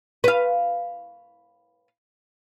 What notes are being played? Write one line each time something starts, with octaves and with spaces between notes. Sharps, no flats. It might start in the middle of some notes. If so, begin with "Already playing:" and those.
B4 F5